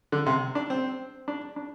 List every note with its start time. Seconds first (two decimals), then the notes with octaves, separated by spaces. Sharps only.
0.12 D3
0.26 C3
0.55 D4
0.70 C4
1.28 D4
1.56 D4